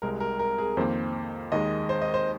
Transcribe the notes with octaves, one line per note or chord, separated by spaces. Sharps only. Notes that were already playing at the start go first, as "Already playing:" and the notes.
C2 C3 G#3 A#4
A#4
A#4
G#4
F2 D#3 A#3 C5
D#2 D#3 G#3 D#5
C5
D#5
C5